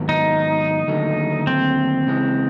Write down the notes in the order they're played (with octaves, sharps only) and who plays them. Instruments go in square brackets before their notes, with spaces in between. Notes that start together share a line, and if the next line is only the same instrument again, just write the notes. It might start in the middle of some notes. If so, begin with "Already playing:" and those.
Already playing: [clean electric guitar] G#2 D#3 F#3 B3
[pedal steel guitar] D#4
[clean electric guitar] D#2 D3 F#3 A3
[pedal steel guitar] C4
[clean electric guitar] C#3 E3 G#3